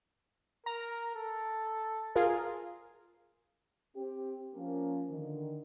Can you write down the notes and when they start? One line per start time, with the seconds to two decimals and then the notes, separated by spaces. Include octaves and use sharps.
0.66 A#4 A#5
1.16 A4
2.16 F4 G#4 A#4
3.96 C4 G4
4.55 F3 A#3 C#4
5.10 D3 D#3